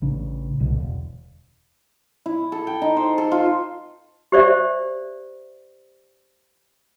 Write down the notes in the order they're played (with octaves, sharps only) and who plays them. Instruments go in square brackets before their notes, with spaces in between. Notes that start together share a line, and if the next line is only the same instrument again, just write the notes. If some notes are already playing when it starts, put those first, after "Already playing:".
[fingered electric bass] A1 C#3 D4
C2 B2 D3
E1
[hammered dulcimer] E4
A4
G5
D#4
C5
A4
F4
[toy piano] G4 C5 D5 E5